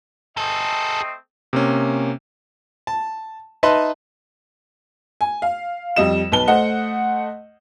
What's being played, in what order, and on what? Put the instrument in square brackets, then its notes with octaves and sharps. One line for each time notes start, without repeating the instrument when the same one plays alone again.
[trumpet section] A3 C4 D#5 [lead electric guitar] G#4 A4
[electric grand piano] C3 A#3 C#4
[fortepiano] A5
D#4 B4 D#5 E5 A5 C6
[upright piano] G#5
F5
F2 G3 D#5 E7
B1 B4 A5 G7
A3 C5 D#5 F#5